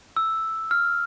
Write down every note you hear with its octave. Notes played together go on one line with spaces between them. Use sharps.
E6
F6